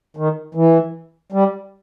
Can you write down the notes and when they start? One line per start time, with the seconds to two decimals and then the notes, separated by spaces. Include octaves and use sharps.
0.17 D#3
0.55 E3
1.32 G3